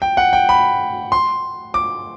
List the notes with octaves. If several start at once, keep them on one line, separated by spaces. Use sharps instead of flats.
G5
F#5
G5
B5
C6
D6